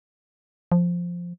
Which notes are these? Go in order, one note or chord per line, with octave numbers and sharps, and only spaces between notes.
F3